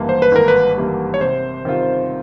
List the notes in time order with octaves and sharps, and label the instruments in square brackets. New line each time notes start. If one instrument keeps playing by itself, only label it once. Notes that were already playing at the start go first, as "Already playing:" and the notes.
Already playing: [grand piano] G#1 G2 E3 G3 A#3
[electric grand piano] C5
B4
[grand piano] G#1 [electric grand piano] A#4
[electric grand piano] B4
[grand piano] G2 E3 G3 A#3
[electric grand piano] C#5
[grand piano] C3 [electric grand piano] C5
[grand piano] D#3 G3 C4 F4